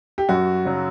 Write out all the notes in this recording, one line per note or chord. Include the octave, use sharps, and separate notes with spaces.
G4
F#2 F#4
C#3 F#3